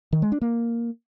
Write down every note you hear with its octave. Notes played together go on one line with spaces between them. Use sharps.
D#3
G#3
D4
A#3